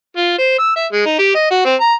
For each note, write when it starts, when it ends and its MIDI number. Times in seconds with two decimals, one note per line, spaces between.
0.17 0.34 65
0.38 0.55 72
0.59 0.74 88
0.76 0.86 76
0.92 1.04 56
1.06 1.19 63
1.19 1.33 67
1.35 1.48 75
1.51 1.63 66
1.65 1.75 60
1.81 1.94 82